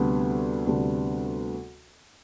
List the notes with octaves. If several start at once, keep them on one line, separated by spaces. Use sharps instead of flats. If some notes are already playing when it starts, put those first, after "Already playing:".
Already playing: D2 C3 G3 B3 D4
D2 C3 G3 B3 D4